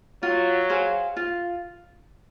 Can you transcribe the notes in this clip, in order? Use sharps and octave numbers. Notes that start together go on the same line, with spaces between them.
F#3 F4
G#4 C5 F5
F4